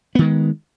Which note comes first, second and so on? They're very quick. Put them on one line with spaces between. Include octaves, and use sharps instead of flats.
B3 D#3 G#3